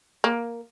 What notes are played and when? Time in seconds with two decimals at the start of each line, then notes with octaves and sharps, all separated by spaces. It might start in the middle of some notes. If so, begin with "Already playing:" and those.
0.24 A#3